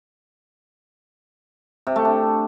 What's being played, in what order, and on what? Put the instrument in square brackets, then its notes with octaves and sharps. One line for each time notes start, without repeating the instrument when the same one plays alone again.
[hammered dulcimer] C3
A3
D4